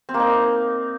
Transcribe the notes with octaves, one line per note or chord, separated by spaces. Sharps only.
C4
A#3
D#4